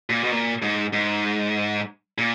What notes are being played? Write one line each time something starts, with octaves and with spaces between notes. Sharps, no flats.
A#2
B2
A#2
G#2
G#2
A#2